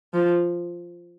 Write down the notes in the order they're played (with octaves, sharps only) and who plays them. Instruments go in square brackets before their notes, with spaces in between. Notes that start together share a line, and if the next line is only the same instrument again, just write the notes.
[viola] F3